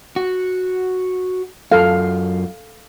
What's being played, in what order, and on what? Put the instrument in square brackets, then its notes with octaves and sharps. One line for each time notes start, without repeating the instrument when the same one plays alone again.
[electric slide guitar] F#4
[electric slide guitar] F#2 F4 [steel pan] A4 F5